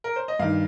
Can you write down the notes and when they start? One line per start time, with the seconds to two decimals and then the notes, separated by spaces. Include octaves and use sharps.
0.04 A#4
0.16 C5
0.28 D#5
0.39 G2 D#3 F5